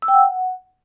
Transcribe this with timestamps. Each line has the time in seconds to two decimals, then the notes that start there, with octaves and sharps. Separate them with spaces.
0.02 E6
0.08 G5
0.14 F#5